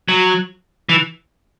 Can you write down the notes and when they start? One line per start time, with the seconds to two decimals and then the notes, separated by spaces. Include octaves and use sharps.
0.09 F#3
0.89 E3